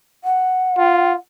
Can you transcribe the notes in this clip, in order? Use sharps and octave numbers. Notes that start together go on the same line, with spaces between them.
F#5
F4